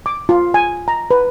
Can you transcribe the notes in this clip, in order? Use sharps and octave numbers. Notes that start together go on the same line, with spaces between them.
D6
F4
G#5
A#5
B4